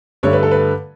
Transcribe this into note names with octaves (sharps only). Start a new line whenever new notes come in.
G2 D3 A3 C#5
B4
A4
B4